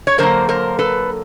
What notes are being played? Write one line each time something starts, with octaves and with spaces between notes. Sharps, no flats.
C#5
D3 F#3 A#3 A#4 C5
A#4 C5
A4 B4